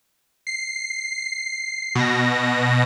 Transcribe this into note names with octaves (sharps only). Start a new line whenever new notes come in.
C7
B2 A#6